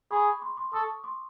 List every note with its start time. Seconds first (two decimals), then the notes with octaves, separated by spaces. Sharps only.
0.11 G#4 B5 C#6
0.42 C6 D6
0.57 C6 D6
0.73 A4 C#6 D#6
1.04 C6 D6